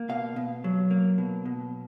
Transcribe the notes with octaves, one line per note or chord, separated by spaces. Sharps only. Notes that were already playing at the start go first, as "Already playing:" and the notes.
Already playing: A#3
B2 F5
B2
F#3
A#3
B2
B2